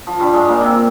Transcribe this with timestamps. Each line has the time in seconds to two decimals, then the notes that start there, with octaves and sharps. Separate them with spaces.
0.07 F3
0.20 G2 G3
0.33 G#2 G#3
0.48 A#2 A#3
0.61 C3 C4